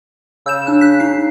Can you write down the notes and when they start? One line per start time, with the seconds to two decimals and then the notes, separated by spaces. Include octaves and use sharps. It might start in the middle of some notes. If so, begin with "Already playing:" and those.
0.46 C#3 E6 G6 E7
0.67 D4 F#6
0.81 F#6 B6
1.00 D#4 C7